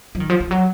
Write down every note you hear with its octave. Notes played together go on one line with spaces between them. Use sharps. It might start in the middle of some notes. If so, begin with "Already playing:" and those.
F3
D#3
F3
F3
F#3